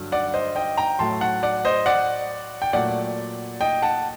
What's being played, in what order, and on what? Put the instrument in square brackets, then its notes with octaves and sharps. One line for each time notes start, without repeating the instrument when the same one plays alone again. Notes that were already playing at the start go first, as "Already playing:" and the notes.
Already playing: [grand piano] G2 D3 F#3
D5 F#5
C5 D#5
D#5 G5
G5 A#5
A2 F#3 A3 A5 C6
F#5 A5
D5 F#5
C5 D#5
D5 F#5
G5
A#2 F#3 A3 D5 F#5
D#5 G5
F#5 A5